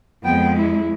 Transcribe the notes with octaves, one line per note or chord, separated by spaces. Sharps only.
F2 G#3 B3 G5
E4